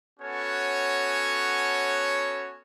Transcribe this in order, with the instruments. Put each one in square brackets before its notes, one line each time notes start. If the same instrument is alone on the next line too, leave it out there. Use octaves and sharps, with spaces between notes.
[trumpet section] B3 C#4 F#4 A4 C#5